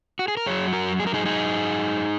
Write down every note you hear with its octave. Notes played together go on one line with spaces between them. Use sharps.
F#4
G#4
A#4
F#2 F#3 G#4 C#5
F#4 A#4
G#4
A#4
D#4 G#4
D#4 G#4